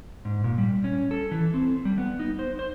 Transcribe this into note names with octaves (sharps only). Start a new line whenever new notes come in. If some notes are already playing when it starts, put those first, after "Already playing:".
G#2
A#2
G3
C#4
A4
E3
C4
G3
B3
D#4
C5
C5